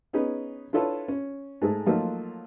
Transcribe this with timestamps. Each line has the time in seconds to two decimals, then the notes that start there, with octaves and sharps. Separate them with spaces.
0.13 B3 C#4 D#4 G#4 B4
0.73 D4 E4 F4 A4 B4 C#5
1.08 C#4
1.62 G#2 A3 G#4
1.86 F3 F#3 A3 A#3 D#4 F4